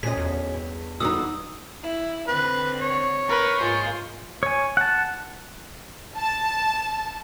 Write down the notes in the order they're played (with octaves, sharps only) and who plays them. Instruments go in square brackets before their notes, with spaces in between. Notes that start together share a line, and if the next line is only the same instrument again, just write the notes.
[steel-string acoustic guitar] D2 C#4 [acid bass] A#2 [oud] G#4 D#5 [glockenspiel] B6
[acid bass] E2
[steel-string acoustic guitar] G2
[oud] D3 B3 D#4 [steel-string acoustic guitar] E3 G3 F#4 [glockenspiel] D#6 E6
[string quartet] E4
[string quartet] D3 C4 [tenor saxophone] B4
[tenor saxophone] C#5
[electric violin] A#4 B4
[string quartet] G#2 G#3 A#3 [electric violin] F4 C5
[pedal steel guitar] C#5 G#5
F#5 A5
[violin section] A5